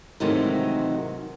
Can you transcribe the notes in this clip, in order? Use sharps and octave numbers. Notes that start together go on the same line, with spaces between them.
G#2 C3 D#3 E3 F#3 A3